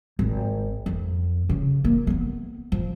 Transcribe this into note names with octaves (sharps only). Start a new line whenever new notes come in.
G#1
F2
C#3
A#3
A3 B3
F3